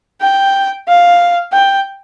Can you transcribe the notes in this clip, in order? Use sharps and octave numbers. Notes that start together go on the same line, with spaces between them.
G5
F5
G5